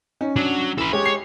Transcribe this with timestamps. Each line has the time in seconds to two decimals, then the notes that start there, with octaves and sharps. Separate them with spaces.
0.21 C#4 D#4
0.36 F#3 D4
0.78 E3 A4 B4
0.93 G#3 G4 C#5
1.06 C7